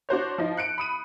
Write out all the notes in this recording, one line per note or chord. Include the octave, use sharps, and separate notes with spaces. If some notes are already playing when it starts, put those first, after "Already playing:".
D4 F#4 C5 C#5
F3 D#4
F#6 C#7 D7
B5 D#6 D#7